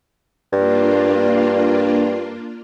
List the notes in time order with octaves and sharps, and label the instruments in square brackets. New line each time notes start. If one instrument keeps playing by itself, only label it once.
[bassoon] G2 [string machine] A#3 D4 F4